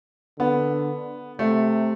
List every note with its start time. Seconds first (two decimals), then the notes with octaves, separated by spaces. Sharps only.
0.39 D3 B3
1.39 C3 A3